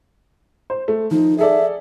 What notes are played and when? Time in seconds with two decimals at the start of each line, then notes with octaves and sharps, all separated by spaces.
0.70 C5
0.88 A3
1.11 F3 D#4
1.39 G#4 A4 D5 E5